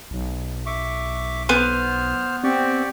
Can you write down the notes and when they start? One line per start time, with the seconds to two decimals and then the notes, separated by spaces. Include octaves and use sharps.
0.11 B1
0.66 E5 C#6 D6
1.49 B3 C5 F6
2.44 C4 G4 D5 C#6